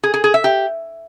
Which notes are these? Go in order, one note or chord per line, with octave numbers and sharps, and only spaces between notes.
G#4
G#4
G#4
E5
G4